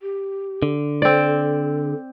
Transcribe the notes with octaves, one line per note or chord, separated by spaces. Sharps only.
G4
D3
C4 A4 D5